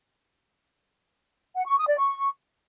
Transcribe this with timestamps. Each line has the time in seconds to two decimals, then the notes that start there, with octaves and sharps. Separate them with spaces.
1.55 F#5
1.66 C#6
1.77 D#6
1.87 D5
1.98 C#6